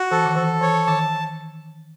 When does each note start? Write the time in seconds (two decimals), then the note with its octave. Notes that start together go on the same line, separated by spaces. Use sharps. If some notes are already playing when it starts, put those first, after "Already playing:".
Already playing: F#4
0.11 E3 A4
0.25 D#3
0.36 E3 A4
0.61 E3 C#5
0.87 D#3 A5